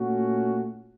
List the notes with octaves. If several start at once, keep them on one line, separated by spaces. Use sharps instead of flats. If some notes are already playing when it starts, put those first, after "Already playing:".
Already playing: A#2 A3 C#4 F#4